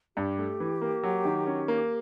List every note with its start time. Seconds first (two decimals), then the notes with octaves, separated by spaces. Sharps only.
0.16 G2 G4
0.39 A3
0.60 E3
0.81 A#3
1.03 F#3
1.25 D#3
1.47 C#4
1.68 A#3